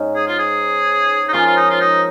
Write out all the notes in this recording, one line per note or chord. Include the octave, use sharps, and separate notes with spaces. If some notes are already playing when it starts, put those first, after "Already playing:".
Already playing: G#2 C#4
G#4
F4
G#4
D#4
F3 C#4 F4 A#4
F4
D#4
F4
D#4